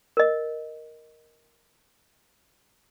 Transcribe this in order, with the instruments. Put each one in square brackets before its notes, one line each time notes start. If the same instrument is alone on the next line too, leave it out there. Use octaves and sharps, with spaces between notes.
[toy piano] A#4 D#5